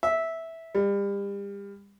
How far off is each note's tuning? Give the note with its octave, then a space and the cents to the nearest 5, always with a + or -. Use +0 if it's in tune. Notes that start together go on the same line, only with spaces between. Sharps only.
E5 -10
G3 +35